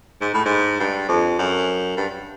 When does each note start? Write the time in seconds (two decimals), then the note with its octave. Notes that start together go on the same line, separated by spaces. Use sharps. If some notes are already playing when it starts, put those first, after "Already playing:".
0.21 G#2
0.34 A2
0.45 G#2
0.80 G2
1.09 F2
1.39 F#2
1.97 G2